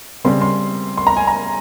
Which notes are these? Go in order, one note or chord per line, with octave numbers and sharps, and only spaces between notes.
C#3 G3 C4 C6
C6
C6
A#5
G#5
A#5